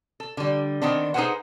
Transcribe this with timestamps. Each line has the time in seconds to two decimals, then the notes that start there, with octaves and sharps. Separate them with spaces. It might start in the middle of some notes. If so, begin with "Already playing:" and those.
0.20 A4
0.37 D3 G3
0.81 D#3 B3 C4 D4
1.14 D#4 G#4 A4 B4 C5 F#5